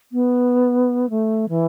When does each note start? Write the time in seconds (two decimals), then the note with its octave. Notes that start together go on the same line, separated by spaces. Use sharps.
0.12 B3
1.09 A3
1.49 E3